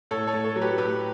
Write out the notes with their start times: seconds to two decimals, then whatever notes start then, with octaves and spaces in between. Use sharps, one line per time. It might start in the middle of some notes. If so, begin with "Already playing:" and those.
0.11 A2 A4 C#5
0.27 A4 C#5
0.33 A2
0.44 A4 C#5
0.56 F#3
0.61 G4 B4
0.78 A2 G4 B4